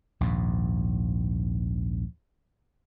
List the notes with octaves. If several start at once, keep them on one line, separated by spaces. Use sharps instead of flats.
A#1 D#2 G#2